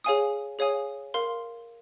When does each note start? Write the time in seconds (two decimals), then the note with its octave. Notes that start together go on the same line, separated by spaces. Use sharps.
0.04 G#4 C#5 F5 G#5 D#6
0.59 G#4 C#5 F5 G#5 D#6
1.14 A#4 F5 C6